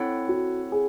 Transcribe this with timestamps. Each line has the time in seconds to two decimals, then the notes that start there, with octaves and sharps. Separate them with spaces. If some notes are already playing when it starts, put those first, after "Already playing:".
Already playing: C4 E4 A4 C#5 F#5
0.29 F#4
0.72 G#4